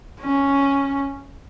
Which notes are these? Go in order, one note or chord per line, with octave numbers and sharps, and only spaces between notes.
C#4